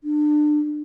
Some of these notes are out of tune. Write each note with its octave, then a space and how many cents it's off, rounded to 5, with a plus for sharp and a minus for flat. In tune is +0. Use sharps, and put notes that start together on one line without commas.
D4 +30